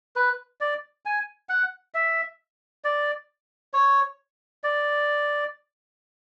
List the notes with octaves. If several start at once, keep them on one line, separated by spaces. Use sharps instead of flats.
B4
D5
G#5
F#5
E5
D5
C#5
D5